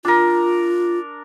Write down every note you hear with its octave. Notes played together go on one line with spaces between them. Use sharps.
D4 F4 A#4